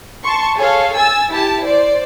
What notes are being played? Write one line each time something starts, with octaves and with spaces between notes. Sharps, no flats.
A5 C6 C#6
G#4 A4 C#5 F5
G#5 E6 A6
E4 G4 A5
C5 D5